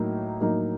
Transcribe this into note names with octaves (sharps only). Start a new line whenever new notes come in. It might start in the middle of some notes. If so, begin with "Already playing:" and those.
Already playing: A2 F#3 A#3 D#4
A2 F#3 A#3 D#4